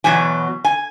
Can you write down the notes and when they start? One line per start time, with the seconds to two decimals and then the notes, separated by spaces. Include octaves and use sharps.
0.04 E2 B2 F#3 G#5
0.65 G#5